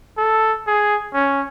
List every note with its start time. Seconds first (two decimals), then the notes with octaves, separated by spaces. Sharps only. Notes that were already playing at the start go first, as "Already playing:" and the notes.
0.17 A4
0.67 G#4
1.14 C#4